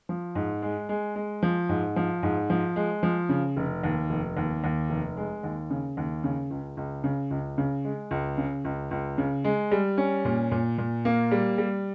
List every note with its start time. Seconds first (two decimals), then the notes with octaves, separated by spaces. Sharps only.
0.09 F3
0.35 G#2
0.62 G#3
0.89 G#3
1.16 G#3
1.43 F3
1.69 G#2
1.96 F3
2.23 G#2
2.50 F3
2.76 G#3
3.03 F3
3.29 C#3
3.57 F1
3.84 D#2
4.10 F1
4.37 D#2
4.64 D#2
4.90 F1
5.17 G#3
5.43 D#2
5.70 C#3
5.97 D#2
6.24 C#3
6.51 C#2
6.77 C#2
7.04 C#3
7.31 C#2
7.58 C#3
7.84 G#3
8.11 C#2
8.38 C#3
8.65 C#2
8.91 C#2
9.18 C#3
9.44 G#3
9.71 G3
9.98 C#4
10.25 A#2
10.51 A#2
10.78 A#2
11.05 A#3
11.31 G3
11.58 G3